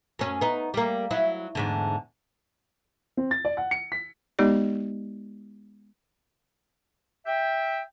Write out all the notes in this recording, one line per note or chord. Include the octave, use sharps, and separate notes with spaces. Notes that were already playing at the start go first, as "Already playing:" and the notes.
F#2 C#4
B3 D#4
G3 A#3
F#3 E4
E2 G#2 D3
C4
A6
D5
F#5
C#7
B6
G#3 B3 D#4 G4 D5
E5 G5